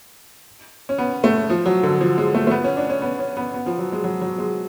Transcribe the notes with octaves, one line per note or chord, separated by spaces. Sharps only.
C#4
B3
A3
F3
F#3
D3
F3
G#3
A3
A3
B3
C#4
D4
C#4
B3
C#4
B3
B3
F3
F#3
G#3
F#3
F#3
G#3